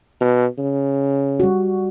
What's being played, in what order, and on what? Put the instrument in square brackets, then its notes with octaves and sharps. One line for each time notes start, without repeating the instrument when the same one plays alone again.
[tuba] B2
C#3
[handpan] G3 F#4